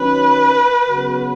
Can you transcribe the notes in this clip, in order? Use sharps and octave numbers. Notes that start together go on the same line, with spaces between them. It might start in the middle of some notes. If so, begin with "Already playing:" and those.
Already playing: D#3 F#3 C#4 B4
C#3 F#3 B3 F#4